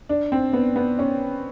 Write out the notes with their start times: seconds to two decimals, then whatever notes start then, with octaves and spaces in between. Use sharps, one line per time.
0.09 D4
0.32 C4
0.53 B3
0.76 B3
0.99 C#4